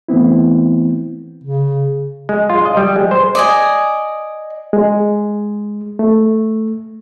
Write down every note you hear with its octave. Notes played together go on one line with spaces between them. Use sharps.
E3 A3 B3 C4 E4
C#3
G#3
F4
D#5
G3
G#3
C5
D5 D#5 G#5
G#3
A3